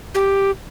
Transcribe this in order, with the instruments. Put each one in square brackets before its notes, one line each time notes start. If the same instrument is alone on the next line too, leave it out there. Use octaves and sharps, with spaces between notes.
[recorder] G4